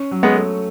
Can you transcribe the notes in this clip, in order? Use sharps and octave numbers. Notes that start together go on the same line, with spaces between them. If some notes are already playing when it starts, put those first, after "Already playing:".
Already playing: C#4
F#3
G#3 B3
A3